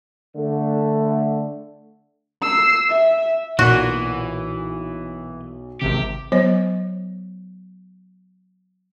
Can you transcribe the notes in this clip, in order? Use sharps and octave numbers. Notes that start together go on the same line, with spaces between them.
D3 A3
E6 C7
E5
B1 A#2 E3 F#4
G#1 C3 G4
F#3 B3 C5 C#5